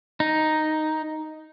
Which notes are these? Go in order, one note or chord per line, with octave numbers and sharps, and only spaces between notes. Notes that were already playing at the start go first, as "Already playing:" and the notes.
D#4